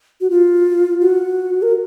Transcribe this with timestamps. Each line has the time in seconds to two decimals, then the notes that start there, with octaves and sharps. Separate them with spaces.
0.21 F#4
0.30 F4
1.01 F#4
1.62 A#4